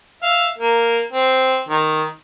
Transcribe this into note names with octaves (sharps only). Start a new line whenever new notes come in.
E5 F5
A#3
C4
D#3